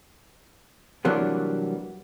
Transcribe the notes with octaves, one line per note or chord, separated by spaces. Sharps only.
C3 E3 F#3 G3 A#3 D4